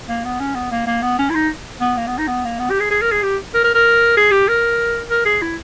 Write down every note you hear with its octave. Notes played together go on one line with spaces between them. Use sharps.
A#3
B3
C#4
B3
A#3
A#3
B3
C#4
E4
D#4
B3
A#3
B3
D#4
B3
A#3
B3
G4
G#4
G#4
A#4
G#4
G4
A#4
A#4
A#4
G#4
G4
A#4
A#4
G#4
E4